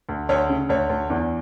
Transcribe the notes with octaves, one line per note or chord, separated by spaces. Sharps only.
D2
D2 C#5
C#3
D2 C#5
D2
E2